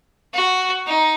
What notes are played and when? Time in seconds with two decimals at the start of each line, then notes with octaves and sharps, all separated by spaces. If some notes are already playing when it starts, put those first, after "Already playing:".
0.34 F#4
0.86 D#4